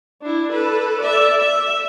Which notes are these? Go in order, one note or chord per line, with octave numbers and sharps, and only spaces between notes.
D4 E4
A4 B4
D5 E5
E5